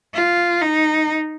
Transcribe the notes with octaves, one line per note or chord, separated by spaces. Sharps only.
F4
D#4